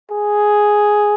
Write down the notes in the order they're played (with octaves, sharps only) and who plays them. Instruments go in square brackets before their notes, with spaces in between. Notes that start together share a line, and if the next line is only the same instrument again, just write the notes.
[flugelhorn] G#4